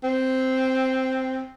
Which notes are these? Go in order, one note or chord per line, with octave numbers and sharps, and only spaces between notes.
C4